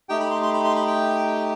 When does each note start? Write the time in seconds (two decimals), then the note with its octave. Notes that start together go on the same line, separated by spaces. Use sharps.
0.09 A3 D#4 G4 G5
0.20 B5
0.31 C6
0.42 C6
0.54 B5
0.64 C6
0.76 B5
0.87 G5